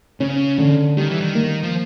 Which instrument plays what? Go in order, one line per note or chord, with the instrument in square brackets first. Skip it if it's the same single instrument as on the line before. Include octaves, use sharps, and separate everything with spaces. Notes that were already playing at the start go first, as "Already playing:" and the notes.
[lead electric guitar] C#3 [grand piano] C#4
[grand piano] D3
[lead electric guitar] D#3 [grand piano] G3
[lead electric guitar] E3
D#3
[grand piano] A#3
[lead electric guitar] F3